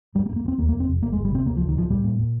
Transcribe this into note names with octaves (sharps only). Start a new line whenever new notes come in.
G2 G3
A#3
G2
A#3
G2
C4
D#2 A#3
A#3
F1
C4
F1
G1 A#3
G#3
G1
G3
C3 C4
C#2 A#3
F3
C#2
D#3
C#2 F3
A#2 G3
A#2
A#2